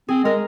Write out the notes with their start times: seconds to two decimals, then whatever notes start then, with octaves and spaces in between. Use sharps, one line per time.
0.09 C4 G#4
0.24 G#3 A#4